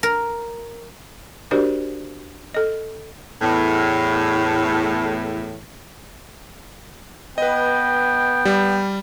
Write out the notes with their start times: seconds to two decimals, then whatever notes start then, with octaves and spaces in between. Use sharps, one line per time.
0.03 A#4
1.51 D4 F#4 G4 A#4 C5 D5
2.54 A4 D#5
3.41 E2 A2
7.38 B3 B4 D#5 G5
8.45 G3